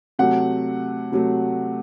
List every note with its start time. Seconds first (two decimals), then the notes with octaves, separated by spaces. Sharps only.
0.19 C3 F#3 A3 F#5
1.12 C3 F#3 A3